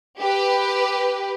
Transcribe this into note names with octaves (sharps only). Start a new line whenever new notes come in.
G4 B4